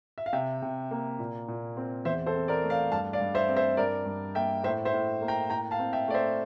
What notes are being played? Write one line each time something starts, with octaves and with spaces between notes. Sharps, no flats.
E5
F5
C3 E5 G5
C3
A#3
A#2
A#2
C4
E2 C5 E5
A4 C5
C4
A#4 D5
A3
D5 F5
G2 F5 A5
D5 F5
G2
C5 E5
C4
C5 E5
G2 A#4 D5
G2
A#3 E5 G5
A2 C5 E5
C5 E5
A2
A#3
G5 A#5
A2 G5 A#5
F5 A5
C4
E5 G5
A3 D5
C5 E5